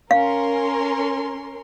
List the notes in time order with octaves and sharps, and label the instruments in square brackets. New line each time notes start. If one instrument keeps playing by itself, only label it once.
[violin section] C#4 A#4 C6 [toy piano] F5